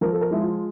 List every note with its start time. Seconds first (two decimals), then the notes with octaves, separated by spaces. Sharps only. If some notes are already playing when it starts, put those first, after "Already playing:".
0.01 F3 A#4
0.12 A4
0.21 A#4
0.31 G#3 E4
0.40 F4